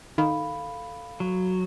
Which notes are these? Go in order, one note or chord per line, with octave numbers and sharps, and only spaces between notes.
D#3 A4 F5 B5
F#3